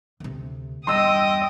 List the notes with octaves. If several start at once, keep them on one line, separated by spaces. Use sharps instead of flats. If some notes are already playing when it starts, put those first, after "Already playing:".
D2 C3
E2 G2 D#5 G5 C6 D#6 E6 D#7